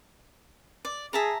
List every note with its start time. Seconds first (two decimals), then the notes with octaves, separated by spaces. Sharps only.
0.85 D5
1.13 G#4 E5 A5 A#5